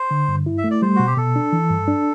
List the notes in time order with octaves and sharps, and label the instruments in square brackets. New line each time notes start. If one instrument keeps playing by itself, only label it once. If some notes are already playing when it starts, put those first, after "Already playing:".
Already playing: [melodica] C5
[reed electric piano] D3
G2
E4
[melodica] E5
[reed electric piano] A3
[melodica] D5
[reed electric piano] G3 [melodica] C5
[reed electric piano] B2 [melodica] F#4
[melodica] G4
[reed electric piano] B2 [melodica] A4
[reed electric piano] D4
E3
G2
D4